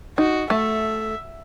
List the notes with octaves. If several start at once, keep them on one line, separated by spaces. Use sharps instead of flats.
D#4 F#4
A3 E5